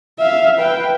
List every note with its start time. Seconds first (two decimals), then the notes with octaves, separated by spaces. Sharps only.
0.19 E5 F5
0.59 B4 G5